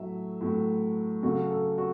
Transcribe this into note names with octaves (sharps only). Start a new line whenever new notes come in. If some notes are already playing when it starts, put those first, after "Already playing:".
Already playing: A2 F#3 A3 E5
A2 F#3 A3
C#3 F#3 A3 F#4
A4
F#4